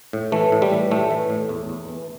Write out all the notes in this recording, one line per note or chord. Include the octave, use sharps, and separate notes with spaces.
A2
E3 A3
A2
G3
E3
A2 A3
E3
A2
E2
E2
E3